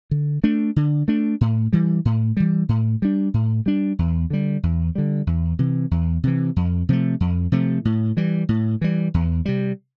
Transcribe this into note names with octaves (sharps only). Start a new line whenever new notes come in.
D3
A3 D4
D3
A3 D4
A2
E3 G3
A2
E3 G3
A2
G3 D4
A2
G3 D4
E2
D3 G3
E2
D3 G3
E2
C3 E3
E2
C3 E3
F2
C3 F3 A3
F2
C3 F3 A3
A2
E3 G3
A2
E3 G3
E2
C3 G3